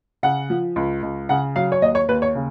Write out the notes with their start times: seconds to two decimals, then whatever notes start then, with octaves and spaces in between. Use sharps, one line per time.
0.23 C#3 F#5
0.50 F3
0.76 C#2
1.02 C#2
1.29 C#3 F#5
1.56 F#3 F5
1.72 C#5
1.82 D#2 D#5
1.95 C#5
2.08 D#2 B4
2.22 C#5
2.35 C#3